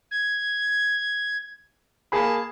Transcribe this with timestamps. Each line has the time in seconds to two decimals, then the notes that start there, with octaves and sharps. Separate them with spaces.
0.11 G#6
2.12 A#3 G#4 A5 B5